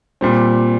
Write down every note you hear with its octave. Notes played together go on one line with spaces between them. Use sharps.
A#2 G3 C4